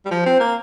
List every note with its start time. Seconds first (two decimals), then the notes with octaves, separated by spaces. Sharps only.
0.05 G3
0.10 F3
0.26 C4
0.40 A#3